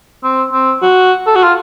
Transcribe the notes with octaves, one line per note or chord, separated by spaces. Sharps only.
C4
C4
F#4
A4
F#4
F4